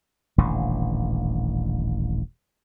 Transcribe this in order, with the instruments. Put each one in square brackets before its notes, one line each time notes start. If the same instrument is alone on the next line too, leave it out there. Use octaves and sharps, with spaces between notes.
[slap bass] D#1 A1 D3